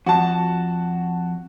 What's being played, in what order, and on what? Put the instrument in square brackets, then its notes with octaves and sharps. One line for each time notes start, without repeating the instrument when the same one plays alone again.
[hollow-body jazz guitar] F2 [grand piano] F#4 A5